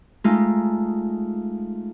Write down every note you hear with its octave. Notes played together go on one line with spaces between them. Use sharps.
G#3 A3 D#4 F4